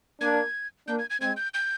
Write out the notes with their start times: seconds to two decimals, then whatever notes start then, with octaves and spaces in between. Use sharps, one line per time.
0.21 A#3 D4 G#6
0.87 A#3 D4 G6
0.99 G#6
1.10 G#6
1.20 G#3 C4 G#6
1.37 G6
1.54 G6